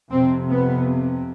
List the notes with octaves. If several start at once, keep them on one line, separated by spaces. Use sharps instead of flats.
F2 C3 C4
B3